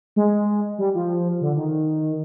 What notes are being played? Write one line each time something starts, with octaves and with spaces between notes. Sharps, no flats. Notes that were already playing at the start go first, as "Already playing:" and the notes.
G#3
G3
F3
D3
D#3